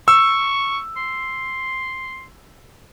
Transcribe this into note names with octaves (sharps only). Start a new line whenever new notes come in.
C#6 E6
C6